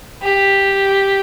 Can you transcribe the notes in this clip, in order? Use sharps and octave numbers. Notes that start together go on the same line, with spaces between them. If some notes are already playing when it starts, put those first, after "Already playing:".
G4